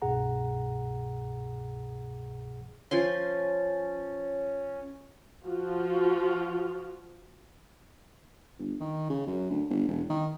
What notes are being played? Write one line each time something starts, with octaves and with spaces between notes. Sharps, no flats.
C2 G2 B2 G#4 F#5 A#5
F3 C#4 C#5 G#5 C6 A6
F3 F4 F#4
G1
D#3
C#3
F#2
D2
G1
E1
D#3